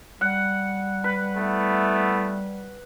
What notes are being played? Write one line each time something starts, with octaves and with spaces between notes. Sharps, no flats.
G3 F#5
B4
A3 B3 E4